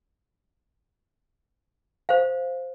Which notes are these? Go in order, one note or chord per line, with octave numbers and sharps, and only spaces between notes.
C5 F5